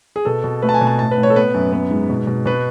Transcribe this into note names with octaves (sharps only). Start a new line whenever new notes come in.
G#4
B2 A4
B2
A3 B4
A5
G#5
B2
A5
A2 A5
B4
A2
C#5
A4
B3 B4
F#2
B3
G#2
B2
B2
B2 B4